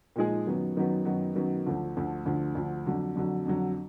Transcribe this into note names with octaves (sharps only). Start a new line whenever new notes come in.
A#2 F3 G#3 D#4 G#4
F#2 D#3 F#3 B3
F#2 D#3 F#3 B3
F#2 D#3 F#3 B3
F#2 D#3 F#3 B3
D2 D3 F3
D2 D3 F3
D2 D3 F3
D2 D3 F3
F2 D3 F#3
F2 D3 F#3
F2 D3 F#3